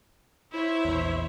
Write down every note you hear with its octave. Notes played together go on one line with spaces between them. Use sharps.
E4 C5 C#5 E5
A#1 E2